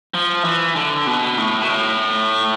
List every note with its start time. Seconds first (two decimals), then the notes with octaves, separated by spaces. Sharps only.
0.14 F3
0.45 E3
0.76 D3
1.07 B2
1.38 A2
1.61 B2
1.70 A2